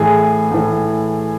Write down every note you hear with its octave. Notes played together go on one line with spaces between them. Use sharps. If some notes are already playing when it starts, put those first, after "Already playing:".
Already playing: A2 E3 G#4
A2 E3